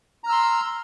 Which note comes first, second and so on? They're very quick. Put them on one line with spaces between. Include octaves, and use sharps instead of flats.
A#5 F6 E6 C6